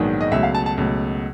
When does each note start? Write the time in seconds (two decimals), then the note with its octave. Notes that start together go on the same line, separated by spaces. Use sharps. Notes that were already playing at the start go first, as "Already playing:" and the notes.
Already playing: A#1 G#2 D#3 F#3 B3
0.21 D#5
0.31 C#2 B2 F#3 A3 E5
0.43 F5
0.55 A5
0.66 A5
0.78 C#2 B2 F#3 A3